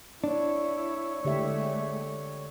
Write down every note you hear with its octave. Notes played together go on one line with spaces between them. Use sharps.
D4 E4 C#5
D3 G#3 A3 G4 E5